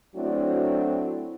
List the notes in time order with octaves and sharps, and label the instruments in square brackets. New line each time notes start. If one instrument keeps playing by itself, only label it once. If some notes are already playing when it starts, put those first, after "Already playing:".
[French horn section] F#3 A3 C4 D4 E4 F#4